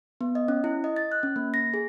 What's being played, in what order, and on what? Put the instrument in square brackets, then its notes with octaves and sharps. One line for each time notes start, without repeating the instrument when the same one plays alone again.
[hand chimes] B3
D#5
C#4
E4
D#5
A6
F#6
C#4
A#3
A#6
G#4